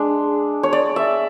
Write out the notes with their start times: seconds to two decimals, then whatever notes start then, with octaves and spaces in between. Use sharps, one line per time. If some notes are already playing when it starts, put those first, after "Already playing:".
Already playing: G#3 D4
0.63 C#5
0.73 D5
0.96 E5